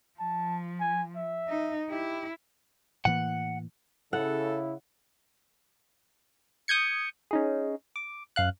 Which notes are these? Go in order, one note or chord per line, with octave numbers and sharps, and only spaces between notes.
F3 A5
G#5
E5
D#4
E4 G4
A2 E3 A#3 F#5
C#3 E4 A4 F#5
D#6 G6 G#6 C#7
C#4 D#4 G#4
D6
F#2 F5 F#6